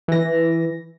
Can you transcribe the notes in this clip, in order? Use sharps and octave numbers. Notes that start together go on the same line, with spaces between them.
E3 A#6